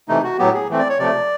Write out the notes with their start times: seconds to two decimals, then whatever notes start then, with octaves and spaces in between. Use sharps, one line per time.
0.08 C3 E3 A3 D#4
0.24 F#4
0.38 A2 F#3 B3 G4
0.54 G#4
0.69 E3 A3 C4
0.79 D5
0.89 C#5
0.99 C3 F3 A3 D5